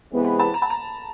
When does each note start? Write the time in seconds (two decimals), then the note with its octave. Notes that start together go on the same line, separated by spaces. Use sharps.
0.11 C3 E3 G#3 B3
0.24 B5
0.39 A5
0.54 A#5
0.62 A5
0.70 A#5